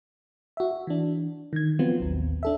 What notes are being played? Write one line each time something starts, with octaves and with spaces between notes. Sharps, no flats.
F#4 E5
E3 D4
D#3 G#6
F3 F#3 B3 C4 F4
A1 D#2
D4 A4 E5